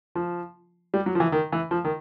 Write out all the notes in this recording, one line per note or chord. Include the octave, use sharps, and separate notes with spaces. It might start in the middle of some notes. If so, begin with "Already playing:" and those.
F3
G3
F#3
F3
E3
D#3
E3
F3
D#3